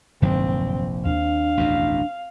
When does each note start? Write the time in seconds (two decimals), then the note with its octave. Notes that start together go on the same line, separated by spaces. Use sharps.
0.22 F1 A#1 G2 D#3 F#3 C4
1.05 D#2 D4 F5
1.57 A1 F2 B2